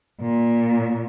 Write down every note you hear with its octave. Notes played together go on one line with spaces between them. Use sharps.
A#2